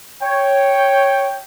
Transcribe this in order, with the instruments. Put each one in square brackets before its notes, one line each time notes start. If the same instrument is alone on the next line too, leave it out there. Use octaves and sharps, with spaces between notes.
[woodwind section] C#5 [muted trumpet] G5